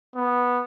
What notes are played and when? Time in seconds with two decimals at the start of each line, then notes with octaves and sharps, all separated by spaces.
0.16 B3